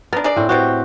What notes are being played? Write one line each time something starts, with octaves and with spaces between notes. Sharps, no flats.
B3 D4 A#4
D4 G#4 D5
A2 C4
B2 C4 F#4 G4